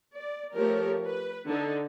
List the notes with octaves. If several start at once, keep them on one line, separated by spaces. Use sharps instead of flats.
D5
F3 A3 G4 A#4 C#5
B4
D3 D#4